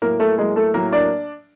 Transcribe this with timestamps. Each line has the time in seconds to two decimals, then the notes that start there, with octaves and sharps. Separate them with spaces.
0.02 A2 F#3 A#3 A#4
0.20 A3 A4
0.38 A2 F#3 G#3 A#3 G#4
0.56 A3 A4
0.74 A2 F#3 A#3 A#4
0.92 D4 D5